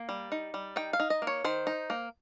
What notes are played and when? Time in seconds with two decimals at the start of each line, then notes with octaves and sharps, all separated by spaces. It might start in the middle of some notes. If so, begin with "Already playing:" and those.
Already playing: A#3
0.09 G3
0.32 D#4
0.54 G3
0.76 D#4 G5
0.93 F5
1.00 D#4
1.10 D#5
1.22 A#3
1.27 C#5
1.44 D#3 C5
1.67 D#4
1.90 A#3